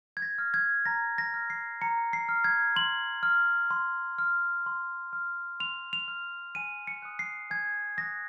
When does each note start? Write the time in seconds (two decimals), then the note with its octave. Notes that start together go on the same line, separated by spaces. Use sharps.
0.17 G#6
0.22 A#6
0.38 F6
0.54 G#6
0.85 A#5 A#6
1.18 A#6
1.34 F6
1.50 C7
1.82 A#5 C#7
2.13 C7
2.29 F6
2.44 G#6
2.76 C6 F#7
3.23 F6
3.71 C6
4.18 F6
4.66 C6
5.13 F6
5.60 C6 F7
5.93 F7
6.08 F6
6.55 G#5 D#7
6.87 C#7
7.02 D#6 F#6
7.19 C7
7.50 G#5 G#6
7.97 D#6 F#6 A#6